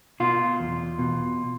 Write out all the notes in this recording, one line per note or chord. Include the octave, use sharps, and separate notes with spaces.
B2 F4
E2
B2